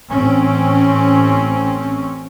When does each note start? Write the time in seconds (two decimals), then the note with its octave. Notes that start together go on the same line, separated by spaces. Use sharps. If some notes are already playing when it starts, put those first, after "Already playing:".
0.11 A1 C4 C#4